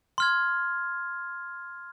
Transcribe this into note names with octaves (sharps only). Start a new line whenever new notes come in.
C6 F6 G#6